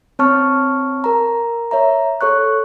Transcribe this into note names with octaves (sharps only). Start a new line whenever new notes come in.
C4 C#5 A5 C#6 F6
A#4 A#5
C#5 E5 A#5
A4 C#5 C#6 F#6